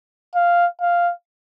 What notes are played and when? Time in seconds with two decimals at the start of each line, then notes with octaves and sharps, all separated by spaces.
0.35 F5
0.81 F5